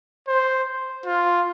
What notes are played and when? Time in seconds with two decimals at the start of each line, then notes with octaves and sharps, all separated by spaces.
0.28 C5
1.06 F4